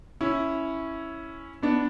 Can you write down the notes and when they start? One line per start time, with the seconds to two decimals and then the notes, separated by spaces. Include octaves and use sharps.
0.21 C#4 E4
1.62 B3 D4